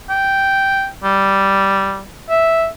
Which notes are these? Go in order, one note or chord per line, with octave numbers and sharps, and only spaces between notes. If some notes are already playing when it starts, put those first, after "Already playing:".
G5
G3
E5